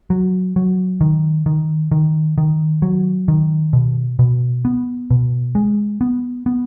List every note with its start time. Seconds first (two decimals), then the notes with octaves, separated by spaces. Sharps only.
0.10 F#3
0.56 F#3
1.01 D#3
1.46 D#3
1.92 D#3
2.38 D#3
2.82 F#3
3.28 D#3
3.73 B2
4.19 B2
4.65 B3
5.10 B2
5.55 G#3
6.01 B3
6.46 B3